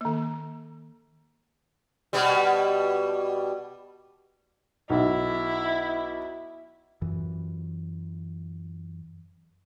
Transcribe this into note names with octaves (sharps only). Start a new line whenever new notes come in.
D#3 A#3
B2 G3
B1 E4
F#2 E3